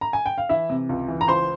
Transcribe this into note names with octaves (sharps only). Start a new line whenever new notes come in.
A#5
G#5
G5
F5
E3 E4 E5
C3
C#2
E3
A#5
C#2 C5 C6